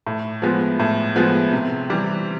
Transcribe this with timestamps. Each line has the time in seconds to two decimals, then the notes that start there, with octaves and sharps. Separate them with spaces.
0.07 A2
0.42 F3 G#3 B3
0.79 A2
1.16 F3 G#3 B3
1.53 C3
1.90 E3 G3